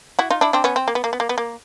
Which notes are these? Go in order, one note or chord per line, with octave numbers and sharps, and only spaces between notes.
E4 F#4
D#4 F4
D4 E4
C4 D4
B3 C#4
C4
A#3
B3
A#3
B3
A#3
B3
A#3